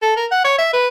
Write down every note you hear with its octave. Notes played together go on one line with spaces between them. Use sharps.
A4
A#4
F#5
C#5
E5
B4